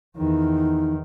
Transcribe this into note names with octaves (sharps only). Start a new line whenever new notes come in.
E2 D#3 D#4